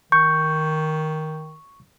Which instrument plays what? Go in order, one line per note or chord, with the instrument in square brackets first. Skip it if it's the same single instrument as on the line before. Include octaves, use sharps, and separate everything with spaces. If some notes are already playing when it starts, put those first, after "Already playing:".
[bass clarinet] D#3 [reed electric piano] C#6 [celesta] G6